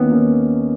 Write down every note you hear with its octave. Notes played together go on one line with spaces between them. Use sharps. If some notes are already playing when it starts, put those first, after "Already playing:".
Already playing: D#2 D#3 A#3 B3 C#4
D#3 A#3 C#4